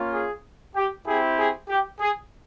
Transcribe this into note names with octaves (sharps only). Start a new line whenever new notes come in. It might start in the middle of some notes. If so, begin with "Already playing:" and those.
Already playing: A#3 C#4 F4
G#4
G4
C4 E4 G4 G#4
G#4
G4
G#4